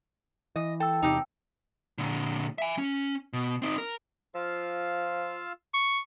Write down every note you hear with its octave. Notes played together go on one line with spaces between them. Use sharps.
E3 D#5
A4 G5 A5 E6
E2 C3 D#4 G4
A#2 D3
E5 G#5
C#4
B2
C4 D#4
A#4
F3 F4 F5 E6
C#6